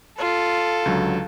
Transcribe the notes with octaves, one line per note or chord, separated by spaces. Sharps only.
F4 A4
C#2 D3 F#3